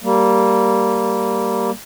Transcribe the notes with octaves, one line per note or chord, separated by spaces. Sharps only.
G3 A#3